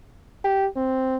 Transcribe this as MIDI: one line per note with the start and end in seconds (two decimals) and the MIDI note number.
0.45 0.66 67
0.76 1.17 60